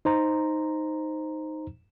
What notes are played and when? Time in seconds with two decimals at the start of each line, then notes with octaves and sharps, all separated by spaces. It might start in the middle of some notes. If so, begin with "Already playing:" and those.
0.05 D#4 C5 A#5